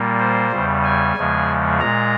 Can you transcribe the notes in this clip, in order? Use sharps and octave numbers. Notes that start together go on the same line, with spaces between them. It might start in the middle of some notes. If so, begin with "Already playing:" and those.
Already playing: A#2 G3 A#3
C5
E2 C#3 G3
G#5
E2 C#3 F3 G#3
A#2 G#3 A#5